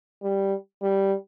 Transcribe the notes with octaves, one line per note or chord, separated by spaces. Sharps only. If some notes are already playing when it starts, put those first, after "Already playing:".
G3
G3